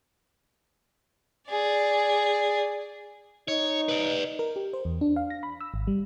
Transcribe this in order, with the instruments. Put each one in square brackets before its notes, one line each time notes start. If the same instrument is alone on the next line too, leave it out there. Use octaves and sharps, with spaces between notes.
[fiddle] G#4 D5
[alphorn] D#4 [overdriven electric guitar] C#5
[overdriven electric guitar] B4 D5
[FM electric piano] A#4
G4
C5
E2
D4
F5
A#6
B5
E6
G#1
G3